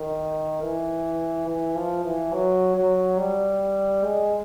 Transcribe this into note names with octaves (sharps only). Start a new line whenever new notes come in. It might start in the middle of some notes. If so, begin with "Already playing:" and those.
Already playing: D#3
E3
E3
F3
E3
F#3
F#3
G3
G#3